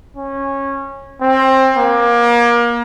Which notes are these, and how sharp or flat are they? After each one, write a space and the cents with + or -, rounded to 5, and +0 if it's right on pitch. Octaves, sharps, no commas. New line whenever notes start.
C#4 -15
C4 +20
A#3 +30